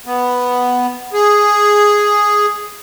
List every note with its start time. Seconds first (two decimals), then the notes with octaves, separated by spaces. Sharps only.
0.06 B3
1.13 G#4